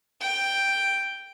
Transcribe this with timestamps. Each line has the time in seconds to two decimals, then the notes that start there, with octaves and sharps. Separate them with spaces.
0.21 G5